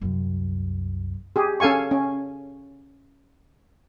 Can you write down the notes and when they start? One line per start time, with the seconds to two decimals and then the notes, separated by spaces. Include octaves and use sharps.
0.01 C2 F#2
1.36 G4 G#4
1.60 C#4 A4 F5 G#5 C#6
1.91 C#4